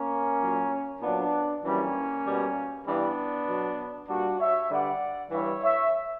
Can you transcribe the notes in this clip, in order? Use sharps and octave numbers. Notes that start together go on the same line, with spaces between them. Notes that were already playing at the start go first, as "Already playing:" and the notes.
Already playing: A#3 C#4
A#2 F#3
A#2 F#3 B3 D4
F#2 E3 G3 A#3 C#4
B2 G3
G2 E3 G3 B3 D4
B2 F#3
A#2 G3 D4 F#4
C#5 E5
G2 D3 G3 D5 F#5
G2 E3 G3 C#5 E5
C#5 E5